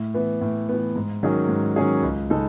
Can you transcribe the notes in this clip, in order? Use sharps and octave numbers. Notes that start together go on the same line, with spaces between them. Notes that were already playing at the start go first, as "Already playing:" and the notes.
Already playing: A2
E3 B3
A2
E3 B3
G#2
D#3 F#3 C#4 G#4
G#2
D#3 F#3 C#4 G#4
C#2
C#3 G#3 D#4 A4